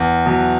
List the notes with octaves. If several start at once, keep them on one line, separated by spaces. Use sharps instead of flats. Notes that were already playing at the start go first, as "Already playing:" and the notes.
Already playing: E2
B2 F#3